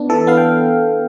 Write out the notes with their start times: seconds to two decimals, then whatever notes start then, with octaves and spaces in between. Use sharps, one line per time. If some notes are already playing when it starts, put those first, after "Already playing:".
Already playing: B3 D4
0.09 E3 A4
0.27 B3 F5
0.37 G5